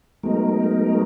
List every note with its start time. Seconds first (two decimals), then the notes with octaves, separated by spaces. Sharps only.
0.23 F#3 G#3 A3 B3 D#4 A#4